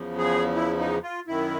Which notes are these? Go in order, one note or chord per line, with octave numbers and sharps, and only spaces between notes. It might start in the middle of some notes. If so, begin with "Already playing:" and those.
Already playing: E2 C#3 F3
G#4
E4
D#4
F4
F#2 D#3 E4